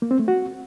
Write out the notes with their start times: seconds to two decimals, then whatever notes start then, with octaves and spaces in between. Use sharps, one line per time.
0.02 A#3
0.11 C4
0.19 A3
0.28 F#4